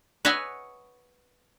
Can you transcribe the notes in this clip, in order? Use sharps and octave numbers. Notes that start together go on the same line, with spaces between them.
B4 C#5 D#5 E5 F#5 G#5